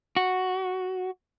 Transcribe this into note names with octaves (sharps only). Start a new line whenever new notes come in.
F#4